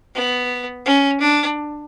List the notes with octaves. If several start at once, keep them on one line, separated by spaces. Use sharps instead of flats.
B3
C#4
D4